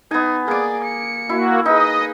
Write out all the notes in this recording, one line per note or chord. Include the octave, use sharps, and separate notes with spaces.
B3 D#4 G#5
A#3 G#4 D5 D6
C#7
A#3 E4 F#4
D#4 G#4 B4 D#5